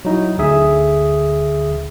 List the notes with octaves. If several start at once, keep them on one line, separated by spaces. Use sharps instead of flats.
F#3 D#4 E4
D2 D3 G#4 E5 D#6